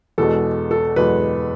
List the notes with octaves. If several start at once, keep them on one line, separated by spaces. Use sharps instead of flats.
E2 B2 G#3 A4
A4
E2 B2 G#3 B4